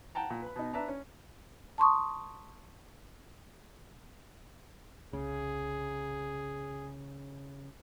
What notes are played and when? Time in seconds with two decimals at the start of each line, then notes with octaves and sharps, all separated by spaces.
0.15 F#5 G5 A5 A#5
0.30 A#2
0.42 B4 B5
0.56 B2 D#4
0.74 D4 B4 D5 E5 A5 A#5
0.88 C#4
1.78 A5 C6 C#6 D#6
5.13 C2 C#3 G#4